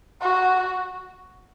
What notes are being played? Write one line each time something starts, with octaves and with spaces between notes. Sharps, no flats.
F#4